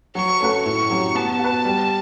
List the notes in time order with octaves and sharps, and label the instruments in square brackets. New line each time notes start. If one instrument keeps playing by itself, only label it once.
[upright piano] F#3 [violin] C#6
[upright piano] A3 C#4 F#4 B4
[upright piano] A2 [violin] C#6
[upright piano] F#3 C#4 G4
[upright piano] B3 [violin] A5
[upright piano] F#4 B4
G3